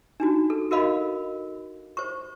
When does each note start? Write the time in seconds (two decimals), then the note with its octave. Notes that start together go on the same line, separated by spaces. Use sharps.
0.20 D4 D#4 F#4
0.50 A4
0.71 F#4 A#4 D#5 F5 B5
1.97 C5 C#6